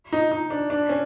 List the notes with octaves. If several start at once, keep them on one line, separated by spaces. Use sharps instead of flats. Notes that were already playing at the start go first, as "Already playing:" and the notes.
D#4
D#4
D4
D4
C#4